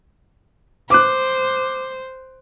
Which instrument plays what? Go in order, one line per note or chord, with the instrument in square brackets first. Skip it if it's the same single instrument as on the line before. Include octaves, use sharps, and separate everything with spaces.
[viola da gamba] C5 [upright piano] D6 F#6